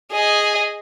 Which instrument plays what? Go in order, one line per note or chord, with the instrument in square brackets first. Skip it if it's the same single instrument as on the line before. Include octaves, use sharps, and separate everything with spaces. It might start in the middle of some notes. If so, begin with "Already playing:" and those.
[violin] G#4 D#5